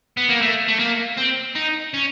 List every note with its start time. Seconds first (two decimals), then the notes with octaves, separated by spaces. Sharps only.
0.17 B3
0.29 A#3
0.42 A3
0.68 A3
0.80 A#3
1.18 C4
1.56 D#4
1.94 C#4